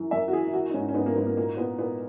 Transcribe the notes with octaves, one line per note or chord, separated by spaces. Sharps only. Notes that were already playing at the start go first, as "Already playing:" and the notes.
Already playing: F#2 E3
F#2 E5
F#4
E3 G#4
E4
E3 F#4
D#4
G#2 C#4
C#4
G#2 B3
A#3
G#2 B3
A#3
A#2 A#3
A#2 B3
A#2 B3